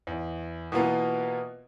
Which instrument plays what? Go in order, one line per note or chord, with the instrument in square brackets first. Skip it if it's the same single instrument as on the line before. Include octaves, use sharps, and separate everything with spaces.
[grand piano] E2
B2 E3 A#3 B3 F4